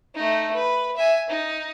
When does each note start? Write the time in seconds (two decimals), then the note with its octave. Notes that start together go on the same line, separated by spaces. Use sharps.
0.15 A3 D#4
0.54 B4
0.97 E5 G#5
1.30 D#4